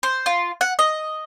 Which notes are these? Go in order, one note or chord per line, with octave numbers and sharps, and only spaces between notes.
C5
F4
F#5
D#5